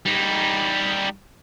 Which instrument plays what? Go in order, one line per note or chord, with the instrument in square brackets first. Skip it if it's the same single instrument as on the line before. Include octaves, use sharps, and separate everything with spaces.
[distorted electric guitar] G3 D#4